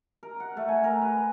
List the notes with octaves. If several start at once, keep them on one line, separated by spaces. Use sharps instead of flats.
A#4
F#5
A3
G#5
A#4
B4